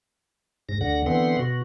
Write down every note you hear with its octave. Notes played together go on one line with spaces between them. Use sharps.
G#2 A#6
D2 D3 F#5 A#6
D3 E3 B3 C4 F#5 C6
B2 F#4